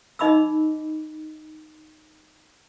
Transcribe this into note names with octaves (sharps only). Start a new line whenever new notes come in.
D#4 D#5 B5 D6 E6